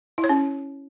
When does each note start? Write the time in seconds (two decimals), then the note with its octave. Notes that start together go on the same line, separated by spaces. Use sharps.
0.18 E4
0.24 C#5
0.29 C#4